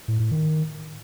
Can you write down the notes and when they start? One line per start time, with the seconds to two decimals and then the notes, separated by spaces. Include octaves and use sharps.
0.08 A2
0.20 A2
0.31 D#3